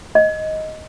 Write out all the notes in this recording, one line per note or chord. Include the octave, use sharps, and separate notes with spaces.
D#5